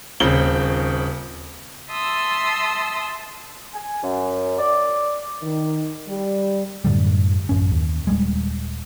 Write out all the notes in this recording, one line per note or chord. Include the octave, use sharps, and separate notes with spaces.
D#1 C#3 C4 G7
E5 A5 C6 D#6 E6
G#5
F#2
D5
D#3
G3
F#2 A2 D3 G3
A1 F#2 C#4
D#2
D#1 G3 G#3